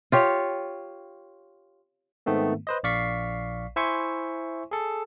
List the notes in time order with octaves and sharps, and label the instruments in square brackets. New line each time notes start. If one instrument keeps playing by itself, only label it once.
[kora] F4 G4 C#5
[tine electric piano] G#2 D#3 A3 B3 C4
B4 C5 D#5
A#1 D5 F5 C#6 B6 C7
E4 C5 E5 G#5 C6 C#6
G#4 A4